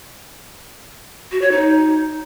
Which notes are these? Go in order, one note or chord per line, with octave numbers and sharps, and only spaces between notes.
F#4
C#5
D#4